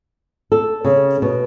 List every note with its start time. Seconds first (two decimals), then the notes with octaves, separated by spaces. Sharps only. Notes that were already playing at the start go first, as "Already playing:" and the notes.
0.52 A4
0.84 C#3
1.22 B2